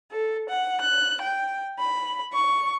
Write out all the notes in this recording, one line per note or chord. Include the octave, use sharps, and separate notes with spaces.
A4
F#5
F#6
G5
B5
C#6